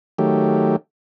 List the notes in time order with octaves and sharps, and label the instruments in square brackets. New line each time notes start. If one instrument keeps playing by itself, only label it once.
[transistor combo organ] D#3 F#3 A3 G4